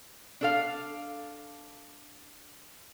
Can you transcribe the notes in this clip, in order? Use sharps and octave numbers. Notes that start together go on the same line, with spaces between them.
D4 A4 F5